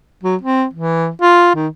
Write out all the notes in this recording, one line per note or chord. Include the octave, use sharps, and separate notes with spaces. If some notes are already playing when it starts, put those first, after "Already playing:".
F#3
C4
E3
F4
D#3